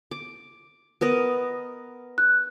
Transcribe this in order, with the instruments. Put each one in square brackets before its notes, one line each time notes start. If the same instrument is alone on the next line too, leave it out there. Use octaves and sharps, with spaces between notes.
[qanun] D6
B3 A#4 D#5
[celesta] F#6